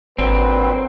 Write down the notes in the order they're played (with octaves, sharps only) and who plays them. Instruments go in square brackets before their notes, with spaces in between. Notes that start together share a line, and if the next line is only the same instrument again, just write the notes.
[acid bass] G#1 [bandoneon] A#2 D3 F#3 [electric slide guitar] C4 [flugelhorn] B4